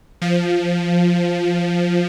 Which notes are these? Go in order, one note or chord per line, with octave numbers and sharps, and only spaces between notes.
F3